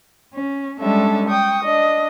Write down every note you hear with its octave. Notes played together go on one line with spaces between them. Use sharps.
C#4
G3 G#3 C#4 D4 A4 E5
G5 C#6 D#6
D4 D#5